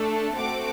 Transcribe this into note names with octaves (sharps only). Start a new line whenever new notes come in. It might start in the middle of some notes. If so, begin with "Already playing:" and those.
Already playing: A3 D4 A4
A3 C4 F#4 A4 D6